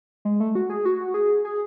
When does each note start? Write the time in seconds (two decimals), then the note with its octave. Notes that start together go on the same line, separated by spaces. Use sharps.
0.25 G#3
0.40 A3
0.55 F#4
0.70 G#4
0.85 F#4
1.14 G#4
1.45 G#4